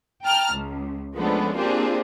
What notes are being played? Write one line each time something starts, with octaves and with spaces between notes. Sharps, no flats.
G5 A5 A#5 F6
C#2
F3 G#3 A3 B3 C#4 D4
A#3 C4 D4 F4 G4 G#4